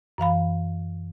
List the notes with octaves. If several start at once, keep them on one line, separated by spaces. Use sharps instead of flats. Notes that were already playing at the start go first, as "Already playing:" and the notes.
F#2 E3 F5 B5